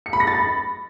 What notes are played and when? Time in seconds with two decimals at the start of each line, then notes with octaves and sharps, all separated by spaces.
0.06 C#7
0.13 B5
0.20 A#6
0.27 A6
0.34 B5